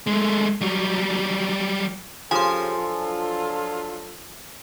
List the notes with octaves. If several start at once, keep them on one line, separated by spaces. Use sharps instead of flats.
G#3 A3
F#3 G3
C#3 F3 C#4 G4 A4 G#5 C6
F#3 D4 F4